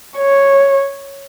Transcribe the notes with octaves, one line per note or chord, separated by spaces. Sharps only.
C#5